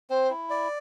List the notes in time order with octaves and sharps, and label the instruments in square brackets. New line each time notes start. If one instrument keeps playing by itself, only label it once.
[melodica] C4 [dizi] C5
[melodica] E4
D5